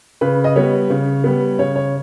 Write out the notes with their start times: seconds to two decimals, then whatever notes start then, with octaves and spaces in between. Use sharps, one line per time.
0.21 C#3 B4
0.44 D#5
0.56 G3 B3 C#5
0.90 C#3
1.24 G3 B3
1.59 C#3 C#5
1.75 C#5